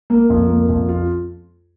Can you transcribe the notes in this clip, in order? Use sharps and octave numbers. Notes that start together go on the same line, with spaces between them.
A#3
F2
A#3
F2
F4